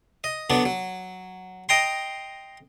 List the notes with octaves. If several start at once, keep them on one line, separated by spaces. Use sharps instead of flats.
D#5
D3 F#3 B3 D4
F#3
D#5 G5 A#5 C6